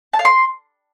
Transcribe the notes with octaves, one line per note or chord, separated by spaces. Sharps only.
A5
F5
C6